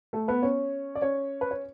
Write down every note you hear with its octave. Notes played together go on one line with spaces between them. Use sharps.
A3 A4
B3 B4
C#4 C#5
D5
C#4 C#5
B4
C#5